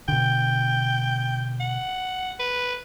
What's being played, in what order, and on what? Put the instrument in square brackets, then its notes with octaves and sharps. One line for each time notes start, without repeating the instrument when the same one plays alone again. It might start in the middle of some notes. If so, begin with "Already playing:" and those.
[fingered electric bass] B2 D3 [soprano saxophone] G5
[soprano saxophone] F#5
B4